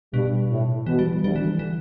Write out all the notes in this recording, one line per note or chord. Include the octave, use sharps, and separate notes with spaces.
G2 B2
A2
B2 E3
G3
E3
D2 D3 G3
E3
E3